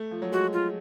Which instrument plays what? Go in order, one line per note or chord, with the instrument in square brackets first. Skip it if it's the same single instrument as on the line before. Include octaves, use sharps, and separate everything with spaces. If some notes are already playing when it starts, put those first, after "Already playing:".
Already playing: [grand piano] A3
F3
F#3
[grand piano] G#3 [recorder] F#4
[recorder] F4